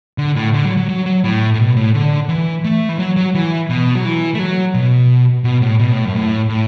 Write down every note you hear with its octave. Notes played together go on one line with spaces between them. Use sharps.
D3
A2
D3
F#3
F#3
F#3
F#3
A2
A2
B2
A2
D3
E3
A3
E3
F#3
F#3
E3
B2
F#3
E3
A3
F#3
B2
B2
A2
B2
A2
F#2
A2
A2